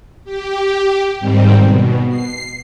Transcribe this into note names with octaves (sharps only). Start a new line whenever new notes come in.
G4
G#2 D#3 G3 C4
B2
C7